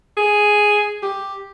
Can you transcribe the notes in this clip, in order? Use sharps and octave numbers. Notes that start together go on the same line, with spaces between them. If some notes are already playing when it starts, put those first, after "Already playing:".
G#4
G4